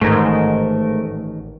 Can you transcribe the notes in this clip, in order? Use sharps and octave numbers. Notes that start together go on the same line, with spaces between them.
A1 G#2 D#3 A3 A#4